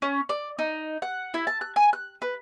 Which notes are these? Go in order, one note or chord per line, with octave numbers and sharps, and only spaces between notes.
C#4
D5
D#4
F#5
E4
A5
F#6
G#5
F#6
B4